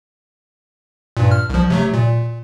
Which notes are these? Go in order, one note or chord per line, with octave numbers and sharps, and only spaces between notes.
G2 A#2
F6
C2 F3
C3 F#3 A3
A#2